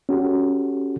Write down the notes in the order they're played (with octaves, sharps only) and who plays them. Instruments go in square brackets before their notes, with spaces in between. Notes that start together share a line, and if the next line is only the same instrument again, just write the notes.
[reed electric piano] C#4 F#4 G4 A4